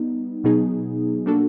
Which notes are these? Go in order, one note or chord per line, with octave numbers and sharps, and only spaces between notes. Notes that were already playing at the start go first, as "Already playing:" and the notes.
Already playing: G3 B3 D#4
B2 F#3 B3 D#4 G#4
G3 A#3 D4 F#4 A4